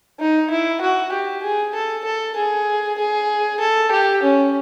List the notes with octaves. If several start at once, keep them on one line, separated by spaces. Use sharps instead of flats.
D#4
E4
F#4
G4
G#4
A4
A4
G#4
G#4
A4
G4
C#4